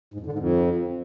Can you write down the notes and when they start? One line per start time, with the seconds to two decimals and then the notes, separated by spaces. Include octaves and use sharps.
0.14 G#2
0.20 F2
0.26 D3
0.32 G#2
0.39 F2